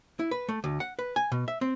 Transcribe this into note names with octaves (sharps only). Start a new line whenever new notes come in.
E4
B4
A3
D2
F#5
B4
G#5
B2
E5
C4